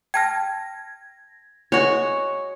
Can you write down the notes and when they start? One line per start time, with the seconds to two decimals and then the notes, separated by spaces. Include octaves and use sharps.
0.14 G5 A5 F6 G#6 A#6
1.72 G#3 F#4 C#5